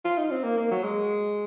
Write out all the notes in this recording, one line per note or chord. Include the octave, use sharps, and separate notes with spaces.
F4
D#4
C4
A#3
A#3
F#3
G#3